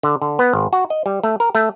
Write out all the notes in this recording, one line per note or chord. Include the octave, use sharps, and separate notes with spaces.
D3
D3
B3
G#1
F#4
D#5
G3
A3
A#4
A3